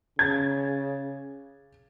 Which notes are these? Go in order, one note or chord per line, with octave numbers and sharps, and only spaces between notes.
C#3 G#6 A6